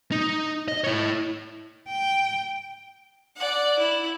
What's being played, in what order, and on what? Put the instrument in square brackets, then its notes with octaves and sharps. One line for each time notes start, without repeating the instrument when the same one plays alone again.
[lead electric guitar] D#4
D#5
E4 C#5
[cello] G5
[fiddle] D5 F#5
E4